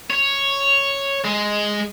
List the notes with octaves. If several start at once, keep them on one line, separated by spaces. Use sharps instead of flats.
C#5
G#3